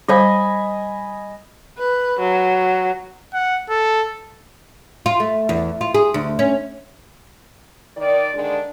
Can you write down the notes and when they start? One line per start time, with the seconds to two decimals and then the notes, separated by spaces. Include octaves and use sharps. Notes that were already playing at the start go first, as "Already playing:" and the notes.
0.08 G3 C5 D#5 F5 G#5 B5
1.78 B4
2.20 F#3
3.34 F#5
3.69 A4
5.06 F4
5.20 A3
5.49 E2
5.81 F4
5.94 G#4
6.14 D2
6.39 C#4
7.97 D#3 D5
8.35 D3 D#3 G#3 D4